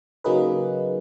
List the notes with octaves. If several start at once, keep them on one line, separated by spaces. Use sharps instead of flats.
C#3 F#3 A#3 D#4 G#4 B4